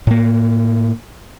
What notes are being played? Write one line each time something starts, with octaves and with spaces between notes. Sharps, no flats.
A2 A#3